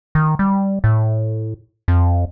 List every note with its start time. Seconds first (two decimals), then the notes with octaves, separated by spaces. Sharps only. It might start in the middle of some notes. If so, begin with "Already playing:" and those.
0.15 D#3
0.39 G3
0.84 A2
1.88 F2